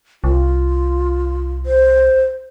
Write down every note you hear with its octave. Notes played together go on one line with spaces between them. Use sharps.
C2 F4
C5